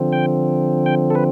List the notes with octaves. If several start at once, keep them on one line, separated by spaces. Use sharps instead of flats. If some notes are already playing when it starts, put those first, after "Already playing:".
Already playing: D3 F3 C4
G5
G5
A4
B4